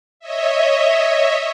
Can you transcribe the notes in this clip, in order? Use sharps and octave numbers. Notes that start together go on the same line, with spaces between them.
C#5 D#5 E5